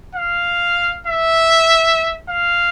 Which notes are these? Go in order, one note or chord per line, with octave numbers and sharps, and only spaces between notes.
F5
E5
F5